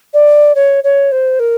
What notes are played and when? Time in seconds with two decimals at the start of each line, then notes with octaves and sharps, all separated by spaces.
0.13 D5
0.55 C#5
0.84 C#5
1.12 C5
1.39 A#4